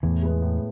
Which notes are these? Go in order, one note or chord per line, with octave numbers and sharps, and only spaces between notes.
E2 A2 E3
G#3 B3
A2